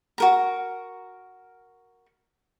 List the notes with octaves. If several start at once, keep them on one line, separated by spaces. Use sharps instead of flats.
F#4 A#4 A#5